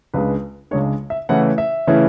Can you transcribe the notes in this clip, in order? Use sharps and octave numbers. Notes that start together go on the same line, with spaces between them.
C#2 C#3 G#3 D4 B4
C#2 C#3 G#3 D4 C#5
E5
C#3 E3 A3 C#4 E4 F#5
E5
C#3 E3 A3 C#4 E4